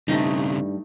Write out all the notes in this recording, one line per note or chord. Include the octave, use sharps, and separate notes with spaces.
G2 C#3 A3 C4 D#4